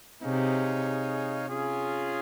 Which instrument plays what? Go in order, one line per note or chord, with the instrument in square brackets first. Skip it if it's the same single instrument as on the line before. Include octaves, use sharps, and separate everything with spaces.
[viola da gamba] C3 [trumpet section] D#4 G#4 C#5 F5
[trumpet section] C#4 F4 G#4